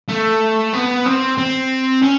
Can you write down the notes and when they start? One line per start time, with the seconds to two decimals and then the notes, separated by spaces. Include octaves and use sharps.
0.09 A3
0.73 B3
1.06 C4
1.38 C4
2.02 C#4